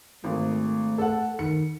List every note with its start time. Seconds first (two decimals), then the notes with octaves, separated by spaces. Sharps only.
0.24 G#1 A3
0.98 A4 F#5
1.39 D#3 C#7